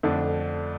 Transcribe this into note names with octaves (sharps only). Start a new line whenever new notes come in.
F2 D3 A3 D4